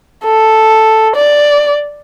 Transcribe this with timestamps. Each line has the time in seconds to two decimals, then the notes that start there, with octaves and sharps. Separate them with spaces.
0.25 A4
1.15 D5